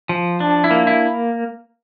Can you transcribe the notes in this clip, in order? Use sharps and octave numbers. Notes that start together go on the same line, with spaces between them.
F3
D4
E4
A#3
E4